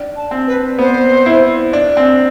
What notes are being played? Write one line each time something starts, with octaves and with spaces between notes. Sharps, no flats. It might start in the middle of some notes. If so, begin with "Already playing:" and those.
Already playing: D4
A5
C4
B4
B3 C5
E4
D4
C4